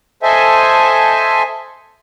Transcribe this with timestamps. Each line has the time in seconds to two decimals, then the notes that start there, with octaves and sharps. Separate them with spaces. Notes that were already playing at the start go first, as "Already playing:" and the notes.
0.23 A4 C5 D#5 E5 G#5